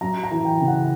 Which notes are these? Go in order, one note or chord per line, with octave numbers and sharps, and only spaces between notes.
F#2 A#5
A#5
E3
G5
C#3
F#5